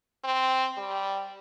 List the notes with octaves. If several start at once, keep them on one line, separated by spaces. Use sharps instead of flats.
C4
G3